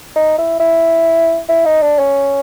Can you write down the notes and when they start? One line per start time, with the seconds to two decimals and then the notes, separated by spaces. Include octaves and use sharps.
0.16 D#4
0.38 E4
0.60 E4
1.49 E4
1.65 D#4
1.82 D4
1.99 C#4